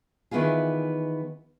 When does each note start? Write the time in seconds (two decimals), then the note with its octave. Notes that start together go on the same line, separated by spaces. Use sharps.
0.31 D#3 E3 B3 E4 F4 G#4